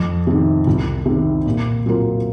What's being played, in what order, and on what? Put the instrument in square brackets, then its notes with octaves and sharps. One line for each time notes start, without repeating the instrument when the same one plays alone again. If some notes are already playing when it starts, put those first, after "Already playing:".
Already playing: [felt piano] F2
C3 D#3
C2
C3
D#3
A#2
F#3 C4 F4 A#4